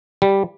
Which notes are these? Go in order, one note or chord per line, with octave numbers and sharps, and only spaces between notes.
G3